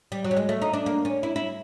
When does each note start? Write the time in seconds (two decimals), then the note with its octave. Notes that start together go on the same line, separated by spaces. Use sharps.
0.12 G3
0.24 F#3
0.31 G3
0.37 G#3
0.49 A3
0.62 D#4
0.73 D4
0.86 A#3
1.05 C#4
1.23 E4
1.36 E4